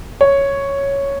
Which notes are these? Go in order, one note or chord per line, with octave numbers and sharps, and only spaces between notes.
C#5